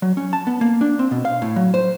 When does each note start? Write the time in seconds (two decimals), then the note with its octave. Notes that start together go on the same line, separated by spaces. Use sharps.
0.02 F#3
0.17 C#4
0.33 A5
0.47 B3
0.61 A#3
0.81 D4
0.99 C4
1.11 B2
1.25 F5
1.42 A2
1.56 F#3
1.74 C5